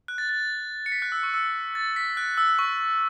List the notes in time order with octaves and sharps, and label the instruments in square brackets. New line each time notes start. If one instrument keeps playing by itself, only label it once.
[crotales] F#6
A6
A6
A6
C#7
B6
F#6
E6
C#6
E6
A6
B6
F#6
E6
C#6